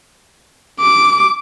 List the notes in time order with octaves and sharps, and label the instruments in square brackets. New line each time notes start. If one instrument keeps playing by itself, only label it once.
[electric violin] D6